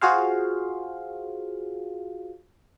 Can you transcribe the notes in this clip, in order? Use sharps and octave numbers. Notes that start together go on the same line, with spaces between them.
F4 F#4 G#4 C5 F5